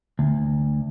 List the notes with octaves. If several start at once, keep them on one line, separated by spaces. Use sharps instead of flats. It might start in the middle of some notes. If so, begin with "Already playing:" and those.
D2